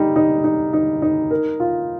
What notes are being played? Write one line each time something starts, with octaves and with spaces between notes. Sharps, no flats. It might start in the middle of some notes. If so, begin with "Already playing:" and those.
Already playing: G3 D#4
D#4
D#4
D#4
D#4
A#4
F4